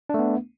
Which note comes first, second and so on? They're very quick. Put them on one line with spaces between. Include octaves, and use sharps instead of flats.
D4 A3 B3